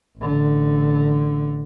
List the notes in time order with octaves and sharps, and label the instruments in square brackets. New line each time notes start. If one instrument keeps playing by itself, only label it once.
[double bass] A1 D3